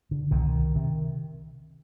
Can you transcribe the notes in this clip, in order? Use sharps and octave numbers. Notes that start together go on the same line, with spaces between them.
D3
C2 B2 D#3
C3